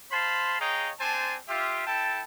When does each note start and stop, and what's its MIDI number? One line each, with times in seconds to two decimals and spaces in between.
0.11 0.57 72
0.11 0.57 77
0.11 0.57 81
0.11 0.57 83
0.11 0.57 84
0.60 0.91 68
0.60 0.91 73
0.60 0.91 75
0.60 0.91 77
0.60 0.91 79
0.60 0.91 82
1.00 1.36 60
1.00 1.36 62
1.00 1.36 72
1.00 1.36 80
1.00 1.36 81
1.49 1.85 65
1.49 1.85 67
1.49 1.85 76
1.87 2.22 64
1.87 2.22 69
1.87 2.22 79
1.87 2.22 81